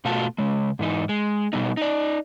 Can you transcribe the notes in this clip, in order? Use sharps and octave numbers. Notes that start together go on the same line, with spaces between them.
B2 A3 F4 F#4 A5
C#3 G#3
G#2 E3 D#4
G#3
B2 G3 B3 D#4
D#4 D5